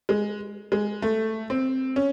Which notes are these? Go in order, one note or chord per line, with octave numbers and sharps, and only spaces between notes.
G#3
G#3
A3
C4
C#4